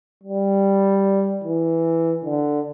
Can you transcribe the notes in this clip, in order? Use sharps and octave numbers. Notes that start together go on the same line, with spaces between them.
G3
E3
D3